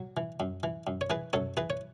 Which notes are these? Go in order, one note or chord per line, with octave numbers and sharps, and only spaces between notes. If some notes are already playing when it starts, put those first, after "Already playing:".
Already playing: F#3
E3
F#2
E3
F#2
C#5
E3 G#4 B4
F#2 A4 C#5
E3 G#4 B4
C#5